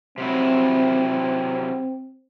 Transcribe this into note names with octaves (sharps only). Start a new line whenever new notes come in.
C3 F#3 C4 E4